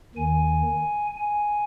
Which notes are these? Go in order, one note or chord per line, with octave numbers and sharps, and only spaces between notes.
D#2 D#3 G#5
G#5